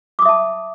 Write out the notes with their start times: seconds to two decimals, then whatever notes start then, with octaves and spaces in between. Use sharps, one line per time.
0.19 D6
0.22 D#6
0.25 E5
0.29 A5